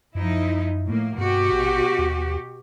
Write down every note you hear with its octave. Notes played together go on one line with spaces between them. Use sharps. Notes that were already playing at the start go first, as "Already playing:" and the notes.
F#2 F3 D#4 E4
A2 A#3
G2 B2 F#4 G4
A1
D#2